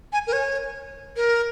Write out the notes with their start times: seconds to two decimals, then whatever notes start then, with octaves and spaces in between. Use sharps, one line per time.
0.13 G#5
0.27 A#4
0.33 C#5
1.16 A#4